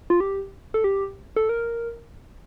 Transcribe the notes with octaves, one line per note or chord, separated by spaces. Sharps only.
F4
G4
A4
G4
A4
A#4